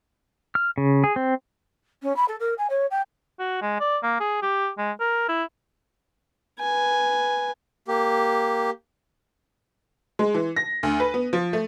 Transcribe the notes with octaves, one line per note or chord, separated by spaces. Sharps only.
F6
C#3
G#4
C4
C#4
B5
A4
A#4
G#5
C#5
G5
F#4
G#3
D5
A#3
G#4
G4
G#3
A#4
E4
B4 G#5
A#3 G4
G#3
E3
A#6
D2
B4
B3
F3
A3